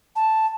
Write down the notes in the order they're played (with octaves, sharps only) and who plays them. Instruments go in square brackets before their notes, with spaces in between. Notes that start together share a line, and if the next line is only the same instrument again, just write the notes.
[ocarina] A5